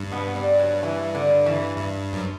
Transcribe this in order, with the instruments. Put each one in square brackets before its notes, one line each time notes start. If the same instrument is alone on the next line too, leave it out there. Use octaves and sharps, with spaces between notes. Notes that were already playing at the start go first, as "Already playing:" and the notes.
Already playing: [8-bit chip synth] G2
[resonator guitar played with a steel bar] B2 B3
G3
F#3
E3
D3
E3
[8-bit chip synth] G2
F#2